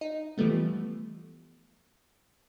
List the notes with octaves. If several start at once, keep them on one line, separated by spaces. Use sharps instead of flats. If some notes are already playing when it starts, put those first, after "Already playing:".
D#4
E3 F3 G3 A3 B3